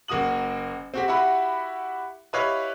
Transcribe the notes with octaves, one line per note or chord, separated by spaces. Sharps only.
F#1 A#3 F#4 D#6 F#7
C4 F#4 G4
E4 F#4 G4 F#5 B5
E4 G4 B4 C#5 D#5 F5